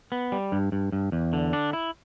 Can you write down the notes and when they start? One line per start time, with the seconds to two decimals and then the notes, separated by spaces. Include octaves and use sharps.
0.12 B3
0.32 G3
0.52 G2
0.72 G2
0.92 G2
1.12 E2
1.33 D3
1.53 D4
1.73 E4